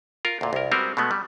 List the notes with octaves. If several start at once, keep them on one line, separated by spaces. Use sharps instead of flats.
F4 A#4
D2 A#2
C2 A#4
G3 G#3 C4 F#4 A#4 B4
B2 G#3 A3 B3
G3